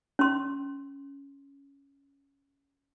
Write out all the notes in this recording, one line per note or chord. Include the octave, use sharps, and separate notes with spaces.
C#4 C6